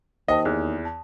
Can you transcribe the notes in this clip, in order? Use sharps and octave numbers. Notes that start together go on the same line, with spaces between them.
D#2 C5 D#5 G5 A5
E2 G#4 F6 F#6
A5